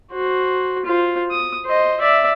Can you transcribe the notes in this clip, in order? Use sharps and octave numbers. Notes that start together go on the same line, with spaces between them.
F#4 C5
F4 C5
D#6
C5 D#5
D5 E5